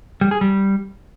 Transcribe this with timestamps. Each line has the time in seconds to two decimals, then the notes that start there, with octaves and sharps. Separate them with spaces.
0.21 G3
0.31 G#4
0.41 G3